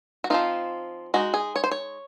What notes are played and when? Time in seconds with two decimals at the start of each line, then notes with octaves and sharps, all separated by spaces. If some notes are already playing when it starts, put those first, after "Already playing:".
0.24 F#4
0.30 F3 C4 D#4 F4
1.14 G#3 D#4 F#4
1.34 G#4
1.56 C#5
1.64 C5
1.71 C#5